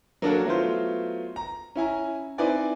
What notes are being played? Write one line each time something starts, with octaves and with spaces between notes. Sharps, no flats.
F#3 A#3 D4 F#4 A4 A#4
F#3 A3 B3 E4 F4 C5
A#5
C#4 E4 G#5 A#5
C4 D#4 E4 B4 D5 G#5